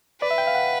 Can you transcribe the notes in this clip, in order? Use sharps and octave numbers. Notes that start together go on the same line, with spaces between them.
B4 D5
E5
G5
F5
F#5